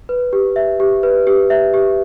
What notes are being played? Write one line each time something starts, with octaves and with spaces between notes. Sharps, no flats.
B4
G4
E5
G4
B4
G4
E5
G4